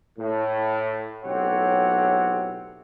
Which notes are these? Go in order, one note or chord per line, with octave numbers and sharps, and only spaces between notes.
A2
B1 A2 C4 G4 C#5 F#5